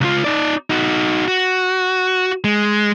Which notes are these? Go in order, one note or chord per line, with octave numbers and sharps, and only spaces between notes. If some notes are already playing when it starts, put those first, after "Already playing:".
C#2 F4
D#4 D5
D#4 F#4
F#4
G#3